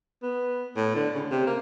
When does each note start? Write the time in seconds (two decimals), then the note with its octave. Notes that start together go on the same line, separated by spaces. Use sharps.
0.22 B3
0.76 A2
0.95 D3
1.15 C#3
1.31 C3
1.47 A#3